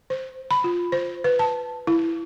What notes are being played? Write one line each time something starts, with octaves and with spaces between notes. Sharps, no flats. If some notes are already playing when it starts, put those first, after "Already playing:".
C5
B5
F4
C5
B4
A5
E4